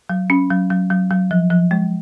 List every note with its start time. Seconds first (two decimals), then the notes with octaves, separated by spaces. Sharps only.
0.09 F#3
0.30 C#4
0.50 F#3
0.70 F#3
0.90 F#3
1.11 F#3
1.31 F3
1.50 F3
1.71 G#3